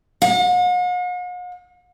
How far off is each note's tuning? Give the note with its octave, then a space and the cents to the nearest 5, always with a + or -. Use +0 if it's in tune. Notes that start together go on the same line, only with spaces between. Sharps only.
F#5 -45